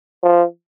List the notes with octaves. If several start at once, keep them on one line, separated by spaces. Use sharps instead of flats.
F3